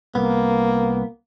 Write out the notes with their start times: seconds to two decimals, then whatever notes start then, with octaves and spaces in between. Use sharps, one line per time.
0.15 C2 A#3 B3